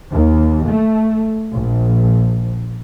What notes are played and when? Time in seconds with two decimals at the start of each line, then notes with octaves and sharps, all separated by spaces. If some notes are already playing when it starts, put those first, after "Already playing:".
0.10 D#2
0.68 A3
1.52 A#1